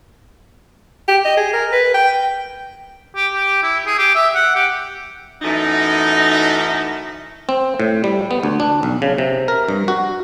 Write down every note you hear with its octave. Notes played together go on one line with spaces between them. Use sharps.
G4
D#5
G#4
A#4
B4
G5
G4
G4
E4
G#4
G4
E5
F#5
G4
F#2 E3 A3 D#4
C4
A2
G3
B3
D2
D4
B1
C#3
C3
A#4
G2
F#4